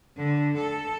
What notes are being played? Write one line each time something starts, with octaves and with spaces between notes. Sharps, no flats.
D3
A4